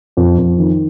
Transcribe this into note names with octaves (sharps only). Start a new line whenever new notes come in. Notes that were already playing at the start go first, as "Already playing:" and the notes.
F2
F2
D#3